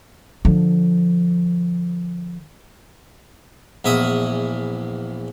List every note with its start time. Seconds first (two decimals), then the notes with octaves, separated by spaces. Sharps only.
0.45 D3 F3
3.84 A#1 E2 E5 D#6